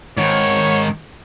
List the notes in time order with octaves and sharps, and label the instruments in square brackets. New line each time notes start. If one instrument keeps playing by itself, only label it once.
[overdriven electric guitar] G#2 D#3 [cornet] C#5